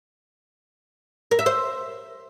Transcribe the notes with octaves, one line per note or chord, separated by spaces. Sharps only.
A#4
E5
C5